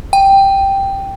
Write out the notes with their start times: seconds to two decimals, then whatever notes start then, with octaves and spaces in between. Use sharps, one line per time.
0.13 G5